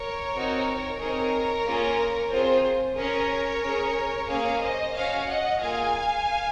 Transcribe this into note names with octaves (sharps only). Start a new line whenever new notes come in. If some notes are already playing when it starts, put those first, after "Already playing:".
Already playing: A#4 C#5
C4 D#4 F#4
C4 D#4 G#4 A#4 C#5
A#3 C#4 F4 G#4
C4 F4 G#4 C5
C#4 G#4 A#4 C#5
C#4 G#4
A#3 C#4 G#4 C#5 F5
C5 D#5
C#4 F#4 C#5 F5
D#5 F#5
A#3 F4 G#4 F5 G#5